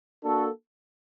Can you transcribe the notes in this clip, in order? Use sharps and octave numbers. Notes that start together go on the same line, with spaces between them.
A#3 D4 F#4 A4